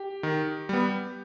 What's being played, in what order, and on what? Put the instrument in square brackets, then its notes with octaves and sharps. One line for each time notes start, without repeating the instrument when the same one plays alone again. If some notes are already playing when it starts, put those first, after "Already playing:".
Already playing: [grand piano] G4
[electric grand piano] D#3
G3 B3